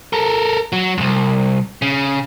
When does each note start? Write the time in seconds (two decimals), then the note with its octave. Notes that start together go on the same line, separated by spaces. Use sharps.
0.13 A4 A#4
0.72 F#3
0.98 C2 F2
1.82 C#3